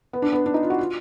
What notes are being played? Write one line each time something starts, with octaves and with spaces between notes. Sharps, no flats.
B3
D4
B3
D4
D#4
F4
F#4
F4